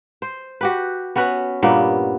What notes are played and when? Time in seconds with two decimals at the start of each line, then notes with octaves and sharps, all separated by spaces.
0.22 C5
0.61 F#4 G4 B4
1.16 B3 C#4 F#4 B4
1.63 G2 A#2 A#3 B3